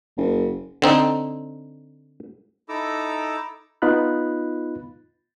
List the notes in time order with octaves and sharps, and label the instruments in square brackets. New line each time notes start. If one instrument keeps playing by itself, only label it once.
[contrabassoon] F#1
[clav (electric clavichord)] D3 C4 D#4
[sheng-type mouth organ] D#4 E4 A4 A#5 D6 E6
[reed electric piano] B3 D#4 F4 B5 F#6